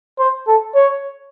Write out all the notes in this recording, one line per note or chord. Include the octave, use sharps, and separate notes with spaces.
C5
A4
C#5